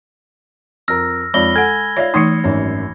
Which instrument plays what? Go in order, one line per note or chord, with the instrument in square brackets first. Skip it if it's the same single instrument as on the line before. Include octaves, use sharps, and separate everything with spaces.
[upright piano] F2 A#4 [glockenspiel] E6 F6 A#6
[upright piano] F2 C#5 D5 [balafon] G#3 [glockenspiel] B5 A#6 G7
[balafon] A4 F#5 [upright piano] G#5 [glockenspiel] G#6
[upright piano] F4 F5 [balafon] C#5 D5 E5
[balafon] E3 A3 D#4 [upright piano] D#6 C7 C#7
[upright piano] G#1 F#2 [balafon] C#5